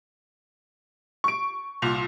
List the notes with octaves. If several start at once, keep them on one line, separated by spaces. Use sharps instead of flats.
C#6 D7
C2 A#2 F7